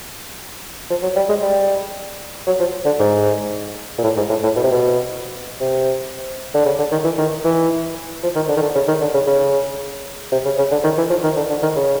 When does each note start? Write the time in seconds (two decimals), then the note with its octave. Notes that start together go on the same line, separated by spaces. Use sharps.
0.90 F3
1.02 F#3
1.16 G3
1.29 G#3
1.42 G3
2.47 F#3
2.59 F3
2.85 D3
2.99 G#2
3.98 A#2
4.04 A2
4.16 G#2
4.29 A2
4.43 A2
4.56 B2
4.63 C3
4.71 B2
5.60 C3
6.54 D3
6.66 C#3
6.78 D3
6.91 D#3
7.04 E3
7.18 D#3
7.44 E3
8.23 F3
8.35 D#3
8.48 D3
8.57 D#3
8.62 D3
8.75 C#3
8.88 D#3
9.01 D3
9.14 C#3
9.27 C#3
10.32 C3
10.45 C#3
10.58 C#3
10.71 D3
10.84 D#3
10.97 E3
11.10 F3
11.23 D#3
11.36 D3
11.49 D3
11.62 D#3
11.76 C#3